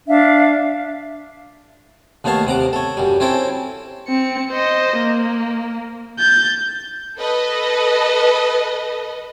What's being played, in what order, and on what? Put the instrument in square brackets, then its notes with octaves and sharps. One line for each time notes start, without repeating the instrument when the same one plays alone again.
[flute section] D4 E5 F5
[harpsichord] D#2 A3 B3 C#5 F5 A5
C3 F#5 A#5 D6
A4 C#5
F#2 G3
C4 C#4 E4 A4 G5
[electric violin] C4 C#7
C5 D#5
A#3
G6 A6
[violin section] A4 B4 D#5